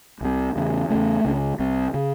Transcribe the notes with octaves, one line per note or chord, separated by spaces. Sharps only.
C2 C3
E2 C#3
E2 C#3 A3
C#2 C#3
C2 C3
C#3